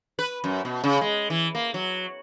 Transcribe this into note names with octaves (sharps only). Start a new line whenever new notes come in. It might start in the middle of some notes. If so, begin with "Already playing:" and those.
B4
F#2
B2
C#3
G#3
E3
A#3
F#3